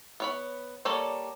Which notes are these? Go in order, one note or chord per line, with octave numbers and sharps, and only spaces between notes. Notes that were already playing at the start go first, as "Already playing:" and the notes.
B3 C#5 B5
G3 A#3 A4 C#5 D5